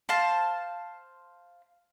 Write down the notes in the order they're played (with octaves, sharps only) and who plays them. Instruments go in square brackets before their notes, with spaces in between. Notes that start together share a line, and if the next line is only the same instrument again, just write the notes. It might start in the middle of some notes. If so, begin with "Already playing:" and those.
[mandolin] C5 F5 A5